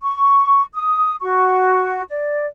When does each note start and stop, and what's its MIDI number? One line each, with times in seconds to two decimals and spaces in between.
0.02 0.65 85
0.74 1.16 87
1.21 2.02 66
1.21 2.02 85
2.09 2.45 74